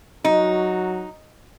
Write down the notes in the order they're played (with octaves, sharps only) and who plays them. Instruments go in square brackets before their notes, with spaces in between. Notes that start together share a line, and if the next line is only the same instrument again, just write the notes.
[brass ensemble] F#3 F#4 [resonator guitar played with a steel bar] D#4